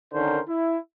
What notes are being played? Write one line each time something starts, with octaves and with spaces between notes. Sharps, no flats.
D3 D#3 C#4 A#4 C5
E4